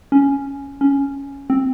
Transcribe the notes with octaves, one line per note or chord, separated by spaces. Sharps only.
C#4
C#4
C4